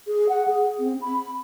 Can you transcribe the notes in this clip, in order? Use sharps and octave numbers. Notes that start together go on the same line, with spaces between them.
G#4
F#5
G#4
C4
B5